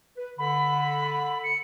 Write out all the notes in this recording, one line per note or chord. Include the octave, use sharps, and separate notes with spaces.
B4
D3 B5
C#7